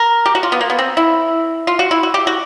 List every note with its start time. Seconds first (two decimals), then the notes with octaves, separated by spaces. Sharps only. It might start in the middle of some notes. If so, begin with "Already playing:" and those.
Already playing: A#4
0.26 G4
0.35 F#4
0.43 F4
0.52 B3
0.61 A#3
0.70 B3
0.79 C4
0.97 E4
1.67 F4
1.79 F#4
1.91 E4
2.03 F#4
2.14 G4
2.27 F#4